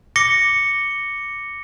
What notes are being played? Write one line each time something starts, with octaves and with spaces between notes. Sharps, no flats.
D6 A#6 C#7 G7